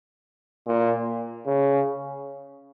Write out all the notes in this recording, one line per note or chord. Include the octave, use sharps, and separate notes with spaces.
A#2
C#3